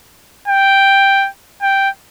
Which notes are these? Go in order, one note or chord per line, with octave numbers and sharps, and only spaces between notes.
G5
G5